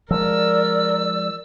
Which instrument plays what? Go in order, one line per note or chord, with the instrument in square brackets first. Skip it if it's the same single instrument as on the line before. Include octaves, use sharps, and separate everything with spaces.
[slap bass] F3 G#3 [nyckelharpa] A#4 [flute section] D5 [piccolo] E6